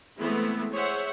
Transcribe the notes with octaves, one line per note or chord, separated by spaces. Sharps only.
E3 G#3 A3 B3 C4 E4
G#4 C5 C#5 E5 F#5